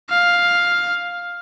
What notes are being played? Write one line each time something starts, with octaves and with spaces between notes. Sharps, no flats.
F5